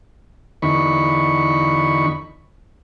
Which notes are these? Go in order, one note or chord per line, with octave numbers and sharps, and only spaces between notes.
E2 D3 D#4 B5 C#6